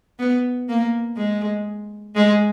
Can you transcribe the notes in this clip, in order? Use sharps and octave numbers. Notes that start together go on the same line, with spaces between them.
B3
A#3
G#3
G#3